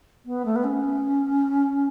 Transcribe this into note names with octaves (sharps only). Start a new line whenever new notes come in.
B3
A3
B3
C#4